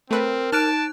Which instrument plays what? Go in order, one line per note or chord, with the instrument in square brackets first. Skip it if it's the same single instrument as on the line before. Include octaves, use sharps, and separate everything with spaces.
[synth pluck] A3 B4 [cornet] C4 [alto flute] A#4
[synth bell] D#4 F#6 D7 [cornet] A5 [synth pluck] F6